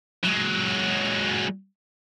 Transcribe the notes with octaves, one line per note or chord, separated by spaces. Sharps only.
F#3 G#3